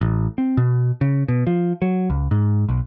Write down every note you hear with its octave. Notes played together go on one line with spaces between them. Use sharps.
A1
C4
B2
C#3
B2
F3
F#3
C#2
G#2
B1